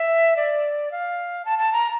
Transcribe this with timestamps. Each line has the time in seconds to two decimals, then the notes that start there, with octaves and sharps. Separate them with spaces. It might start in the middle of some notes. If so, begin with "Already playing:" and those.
Already playing: E5
0.37 D5
0.92 F5
1.45 A5
1.59 A5
1.73 A#5